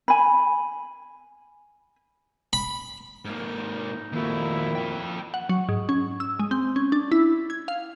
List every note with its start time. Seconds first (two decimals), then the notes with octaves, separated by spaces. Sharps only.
0.08 G#5 B5
2.53 B5
3.25 G#2 A#3 D#4
4.13 F2 A#2 D#3 A#3 E4 F#4
4.75 F3 G5
5.34 F#5
5.49 F#3
5.69 G#2
5.89 C#4
6.20 E6
6.39 G#3
6.51 C4
6.76 C#4
6.92 D4
7.12 E4
7.50 G#6
7.68 F5